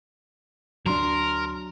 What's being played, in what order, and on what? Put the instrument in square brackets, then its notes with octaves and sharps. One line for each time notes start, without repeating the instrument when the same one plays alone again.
[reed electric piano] D2 C6 [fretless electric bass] F#3 D4 [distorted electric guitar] A#4